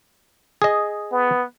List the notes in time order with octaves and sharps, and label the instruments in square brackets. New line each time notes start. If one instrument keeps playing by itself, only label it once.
[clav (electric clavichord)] G#4 D#5
[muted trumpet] B3